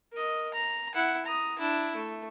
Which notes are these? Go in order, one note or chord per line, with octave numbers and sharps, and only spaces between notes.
A#4 D#5
A#5
E4 F#5
A#5 D#6
D4 E4
A3